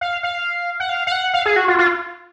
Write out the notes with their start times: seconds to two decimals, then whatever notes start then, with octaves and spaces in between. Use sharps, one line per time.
0.01 F5
0.23 F5
0.80 F#5
0.89 F5
1.07 F5
1.12 F#5
1.34 F5
1.46 G#4
1.56 F#4
1.68 F4
1.78 F4